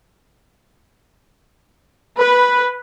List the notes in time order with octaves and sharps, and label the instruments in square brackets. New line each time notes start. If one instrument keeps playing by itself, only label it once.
[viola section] B4